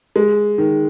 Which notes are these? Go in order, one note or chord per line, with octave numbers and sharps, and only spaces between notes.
G#3
D#3